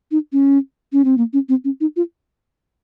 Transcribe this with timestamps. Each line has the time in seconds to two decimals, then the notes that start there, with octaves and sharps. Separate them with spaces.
0.11 D#4
0.33 C#4
0.93 C#4
1.05 C4
1.18 A#3
1.33 C#4
1.49 C4
1.65 C#4
1.81 D#4
1.96 F4